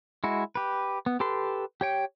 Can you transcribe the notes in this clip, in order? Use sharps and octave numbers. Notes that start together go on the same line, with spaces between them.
G#3 E4 F#4
G4 B4
B3
G4 A4 B4 C6
G4 C#5 G5